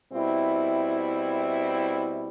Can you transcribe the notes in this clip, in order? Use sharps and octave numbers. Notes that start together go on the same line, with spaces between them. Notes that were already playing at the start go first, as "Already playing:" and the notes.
B2 G3 C4 E4